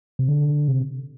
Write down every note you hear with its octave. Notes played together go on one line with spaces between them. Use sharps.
C3
D3
C3